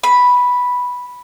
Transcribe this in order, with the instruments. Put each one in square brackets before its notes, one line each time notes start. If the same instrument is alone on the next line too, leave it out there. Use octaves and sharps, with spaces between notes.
[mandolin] B5